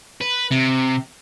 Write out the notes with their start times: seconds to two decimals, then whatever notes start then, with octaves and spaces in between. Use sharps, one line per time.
0.21 B4
0.51 C3